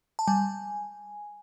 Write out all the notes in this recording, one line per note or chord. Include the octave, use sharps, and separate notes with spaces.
A5
G3 G#5